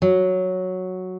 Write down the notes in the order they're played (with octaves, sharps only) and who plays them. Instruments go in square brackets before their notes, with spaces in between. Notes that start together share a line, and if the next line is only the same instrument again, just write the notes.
[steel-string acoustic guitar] F#3